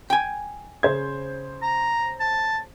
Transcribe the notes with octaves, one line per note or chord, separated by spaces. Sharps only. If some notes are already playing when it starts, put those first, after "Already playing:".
G5 G#5
C#3 C5 G#6
A#5
A5